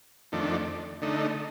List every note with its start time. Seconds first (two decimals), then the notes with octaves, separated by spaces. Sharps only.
0.32 F2 D#3 A3 D4
1.02 D3 A3 D#4